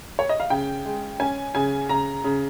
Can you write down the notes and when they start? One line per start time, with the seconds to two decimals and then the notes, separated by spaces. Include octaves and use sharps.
0.19 C#5
0.29 D#5
0.40 F5
0.50 C#3 G5
0.85 G#3
1.20 C#4 G#5
1.55 C#3 G#5
1.89 C#3 A#5
2.24 C#3